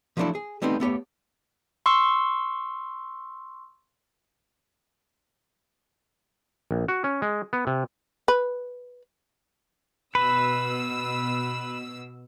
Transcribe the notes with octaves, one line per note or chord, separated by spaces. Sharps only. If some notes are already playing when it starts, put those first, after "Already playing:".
F3 F#3 A3 D4 E4 A4
G#4
G3 A3 B3 C4 D#4
A3 B3 G4 C#5
C6 C#6 E6
A#1
F#4
C#4
G#3
B3
C3
B4
B2 B4 E6